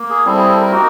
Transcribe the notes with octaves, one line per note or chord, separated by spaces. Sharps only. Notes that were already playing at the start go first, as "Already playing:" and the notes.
Already playing: A#3
G#4
G3 C4 E4 A4
G#4
A4
A#4
A#3 D#4 F#4